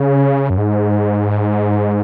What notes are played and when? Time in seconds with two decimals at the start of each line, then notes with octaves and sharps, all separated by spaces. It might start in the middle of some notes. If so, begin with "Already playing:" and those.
Already playing: C#3
0.50 F#2
0.57 G#2